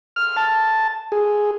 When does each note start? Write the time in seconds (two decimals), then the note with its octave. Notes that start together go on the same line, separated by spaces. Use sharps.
0.16 F6
0.37 A5
1.12 G#4